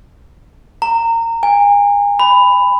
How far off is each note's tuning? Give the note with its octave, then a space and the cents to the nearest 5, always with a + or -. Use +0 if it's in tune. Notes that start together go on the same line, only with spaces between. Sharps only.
A#5 -25
G#5 -35
B5 +15